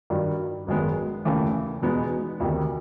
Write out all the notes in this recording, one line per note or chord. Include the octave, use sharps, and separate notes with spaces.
G2 D#3 F#3
G#1 F#2 D#3 G#3 B3
F1 D#2 C#3 E3 A3
E2 B2 G#3 B3 D#4
D2 C3 D#3